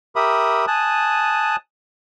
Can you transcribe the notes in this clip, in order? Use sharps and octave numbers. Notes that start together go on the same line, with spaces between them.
G4 A#4 E5 B5 D#6
G#5 A5 D#6 F#6